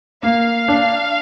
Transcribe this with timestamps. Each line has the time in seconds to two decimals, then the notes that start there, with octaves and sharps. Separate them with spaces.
0.23 A#3 F5
0.68 D4